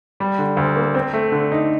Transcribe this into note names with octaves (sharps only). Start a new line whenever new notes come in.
G3
D3
D2
A#3
C4
A3
D3
D#4